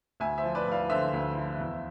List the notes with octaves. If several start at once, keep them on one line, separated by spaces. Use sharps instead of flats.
D2 E5 G#5
C5 E5
F3
B4 D5
D2 D5 F5
D3 C5 E5
D2
F3
E2